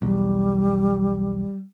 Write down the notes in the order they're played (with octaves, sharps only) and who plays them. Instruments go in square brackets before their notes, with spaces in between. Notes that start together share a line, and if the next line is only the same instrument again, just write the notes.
[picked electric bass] B1 E2 [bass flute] G3